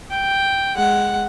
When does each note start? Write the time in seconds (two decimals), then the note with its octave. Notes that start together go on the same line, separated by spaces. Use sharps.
0.11 G5
0.76 G#3 F#5